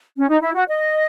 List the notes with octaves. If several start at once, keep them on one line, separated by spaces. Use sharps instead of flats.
C#4
D#4
E4
F#4
D#5